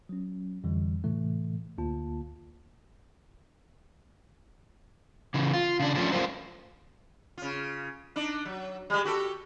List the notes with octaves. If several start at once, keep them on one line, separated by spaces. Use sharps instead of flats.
F#3 C#4
F2 D3 E3 G3
A2 C3 E3 A3
D2 D3 A#3 F4 A5
C#3 E3
F4
C#3 D4
F3 A3 C#4 D4
G3 A3 C#4 F4 A#4 C5
C#3 F4
D4 D#4
F#3
G3 G#3
F#4 G4 A4